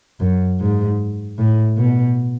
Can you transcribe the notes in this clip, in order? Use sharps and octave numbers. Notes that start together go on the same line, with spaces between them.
F#2
G#2
A2
B2